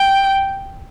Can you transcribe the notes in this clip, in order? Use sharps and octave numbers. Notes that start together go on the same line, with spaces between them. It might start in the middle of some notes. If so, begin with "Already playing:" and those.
Already playing: G5